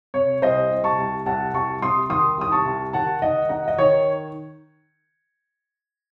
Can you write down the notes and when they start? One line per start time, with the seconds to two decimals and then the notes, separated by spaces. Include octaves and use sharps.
0.14 C3 C#5
0.42 C2 C5 D#5
0.71 C2
0.84 A5 C#6
0.98 C2
1.26 C2 F#5 A5
1.54 C2 A5 C#6
1.82 C3 C6 D#6
2.09 D#3 C6 D#6
2.37 C2 D#6
2.52 A5 C#6
2.65 C2
2.93 D#3 F#5 A5
3.22 D#3 D#5 F#5
3.49 D#4 D#5 F#5
3.68 D#5
3.78 D#3 C#5